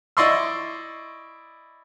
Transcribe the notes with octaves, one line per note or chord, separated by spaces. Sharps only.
E4 D5 D#5 C6 C#6 E6